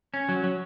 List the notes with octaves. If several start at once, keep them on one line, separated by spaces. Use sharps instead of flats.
C#4
F#3
F#3